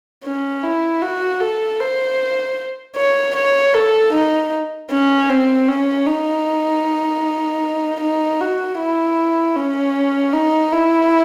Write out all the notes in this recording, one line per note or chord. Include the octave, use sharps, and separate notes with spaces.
C#4
E4
F#4
A4
C5
C#5
C#5
A4
D#4
C#4
C4
C#4
D#4
D#4
F#4
E4
C#4
D#4
E4